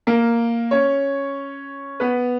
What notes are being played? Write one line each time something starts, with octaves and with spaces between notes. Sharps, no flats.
A#3 A#4
C#4 C#5
B3 B4